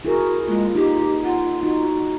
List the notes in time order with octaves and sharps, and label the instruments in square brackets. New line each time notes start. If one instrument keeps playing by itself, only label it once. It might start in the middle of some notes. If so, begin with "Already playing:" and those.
[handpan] E4 G#4 A#4 [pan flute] F#4
[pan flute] G#3 [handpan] A#3 [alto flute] F4
[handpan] D#4 [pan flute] G4
[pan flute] F4 [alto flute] F#5
[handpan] D#4 [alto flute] F#4